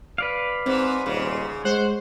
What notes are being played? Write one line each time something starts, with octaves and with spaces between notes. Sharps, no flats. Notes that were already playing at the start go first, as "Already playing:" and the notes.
B4 D5 F5
G#2 C4
D#1 G#2 C#3
G#3 C5 F#5